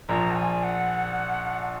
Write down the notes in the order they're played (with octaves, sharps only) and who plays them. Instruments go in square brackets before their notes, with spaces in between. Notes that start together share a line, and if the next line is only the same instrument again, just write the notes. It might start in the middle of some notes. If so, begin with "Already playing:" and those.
[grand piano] A#1 A#2 F3 [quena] A#5
[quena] F#5
G#5
F#5